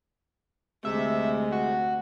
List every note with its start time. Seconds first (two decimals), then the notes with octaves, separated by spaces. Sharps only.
0.85 D2 C3 G#3 E5
1.52 F#4